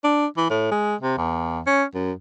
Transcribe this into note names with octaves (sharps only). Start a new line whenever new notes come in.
D4
E3
A2
G#3
C3
E2
C#4
F#2